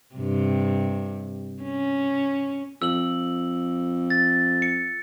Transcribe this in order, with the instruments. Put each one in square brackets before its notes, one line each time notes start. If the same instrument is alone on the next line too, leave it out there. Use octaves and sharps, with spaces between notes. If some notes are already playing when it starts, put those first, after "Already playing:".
[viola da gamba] G2 C3
C#4
[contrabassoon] F2 [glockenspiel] E6 F#7
[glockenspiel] A6
C#7